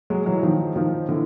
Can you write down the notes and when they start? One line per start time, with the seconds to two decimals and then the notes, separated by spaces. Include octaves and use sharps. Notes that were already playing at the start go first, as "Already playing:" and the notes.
0.10 F#3 G#3
0.26 E3 F#3
0.43 D#3 F3
0.76 D#3 F3
1.09 D3 E3